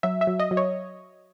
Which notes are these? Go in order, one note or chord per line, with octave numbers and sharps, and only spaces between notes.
F#3 E5
E5
F#3
D#5
F#3
C#5